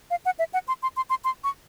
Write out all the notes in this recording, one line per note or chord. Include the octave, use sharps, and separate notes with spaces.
F5
F#5
E5
F#5
C6
C6
C6
C6
C6
C#6